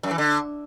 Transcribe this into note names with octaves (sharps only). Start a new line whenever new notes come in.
F#2
E3
D3